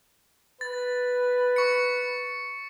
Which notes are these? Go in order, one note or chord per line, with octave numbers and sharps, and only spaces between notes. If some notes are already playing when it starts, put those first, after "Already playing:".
B4 A6
C#6 C#7